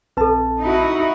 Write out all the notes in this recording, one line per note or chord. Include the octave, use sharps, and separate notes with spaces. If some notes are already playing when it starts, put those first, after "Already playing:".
A#1 C4 A4 B4 A5
D#4 E4 F#4